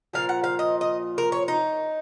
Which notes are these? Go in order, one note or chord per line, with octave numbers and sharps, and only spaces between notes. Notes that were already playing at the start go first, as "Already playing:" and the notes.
A#2 F3 F5
F#5
F5
D#5
D#5
A#4
C#5
D#4